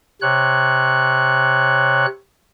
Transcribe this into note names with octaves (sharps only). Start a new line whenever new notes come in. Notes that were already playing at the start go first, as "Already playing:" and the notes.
C3 C#5 F#6